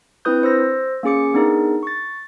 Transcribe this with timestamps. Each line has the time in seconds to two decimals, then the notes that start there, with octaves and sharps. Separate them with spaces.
0.25 C4 D4 E4 B4 D#6 G6
0.43 C5 E6 A#6
1.03 A#3 C#4 G#4 D6 C#7
1.34 B3 D4 D#4 G#4 A#4
1.83 C#6 A6